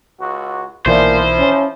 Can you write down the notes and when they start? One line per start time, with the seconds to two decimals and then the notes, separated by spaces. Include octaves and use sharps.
0.20 C#2 F#4
0.86 B1 A#2 E3 F3 E4 C5
1.39 C#4